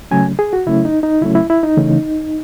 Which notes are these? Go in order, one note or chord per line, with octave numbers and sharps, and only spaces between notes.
C#3 F#3 A3 C#4 G#5
G#4
F#4
C#3 F#3 A3 C#4 E4
D#4
D#4
C#3 F#3 A3 C#4 E4
E4
E4
D#4
C#3 E3 A3 C#4